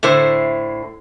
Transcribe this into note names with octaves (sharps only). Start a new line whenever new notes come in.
A2 D3 E4 C5